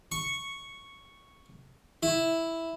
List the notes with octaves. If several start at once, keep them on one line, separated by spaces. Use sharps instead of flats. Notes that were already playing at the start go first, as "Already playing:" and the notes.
C#6
E4